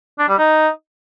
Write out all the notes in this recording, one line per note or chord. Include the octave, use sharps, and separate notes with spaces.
D4
G3
D#4